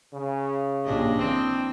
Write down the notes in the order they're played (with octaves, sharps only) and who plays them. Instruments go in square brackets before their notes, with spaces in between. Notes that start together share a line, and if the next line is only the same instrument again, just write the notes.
[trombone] C#3
[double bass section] A#1 A#2 [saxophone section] G2 [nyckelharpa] D4 D#5
[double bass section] E3 [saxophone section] C4